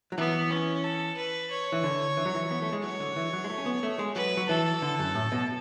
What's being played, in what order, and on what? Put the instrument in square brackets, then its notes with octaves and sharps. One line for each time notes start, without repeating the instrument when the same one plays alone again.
[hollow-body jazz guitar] F#3
[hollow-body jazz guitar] E3 [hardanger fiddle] B3
[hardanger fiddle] C#4
A4
B4
C#5
[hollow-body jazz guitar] E3
D3
E3
F#3
E3
B3
A3
G#3
[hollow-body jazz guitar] F#3 [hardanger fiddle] C#5
[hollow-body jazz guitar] D3
E3
F#3
G#3
A3
C#4
B3
A3
G#3
[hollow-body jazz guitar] F#3 [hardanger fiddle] B4
[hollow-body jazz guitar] F#3
[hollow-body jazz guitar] E3 [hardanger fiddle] A4
[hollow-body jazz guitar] D3
F#2
A2
B2